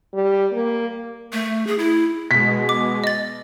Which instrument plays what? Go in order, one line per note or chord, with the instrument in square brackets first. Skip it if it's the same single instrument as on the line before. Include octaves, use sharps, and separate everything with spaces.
[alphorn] G3
A#3
[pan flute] A3
G#4
E4
[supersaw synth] B2 G#3 [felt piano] B6
[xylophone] D6
D#5 A6